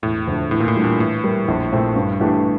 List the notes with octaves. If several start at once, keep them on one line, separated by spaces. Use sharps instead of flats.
E1 A2
D2 D3 F3
E2 A2
A#2
A2
E3 G3 D4 A4
A#2
A2 E3
G3 A#3
A#1
A#2 A3 C4
G2
E3 A3 D4 G4